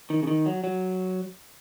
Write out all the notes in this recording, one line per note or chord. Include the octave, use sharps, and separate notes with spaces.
D#3
C#3
D#3
F#3
F#3